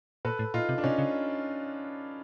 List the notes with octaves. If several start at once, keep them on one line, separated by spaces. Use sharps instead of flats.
A#2 A4 B4
A2
A#2 D#4 F4
C3
D4
C3 C#4 D#4
C#3